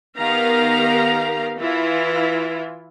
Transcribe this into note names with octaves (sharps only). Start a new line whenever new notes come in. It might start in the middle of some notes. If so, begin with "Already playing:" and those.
D#3 B3 G4 F5 A#5
E3 E4 F4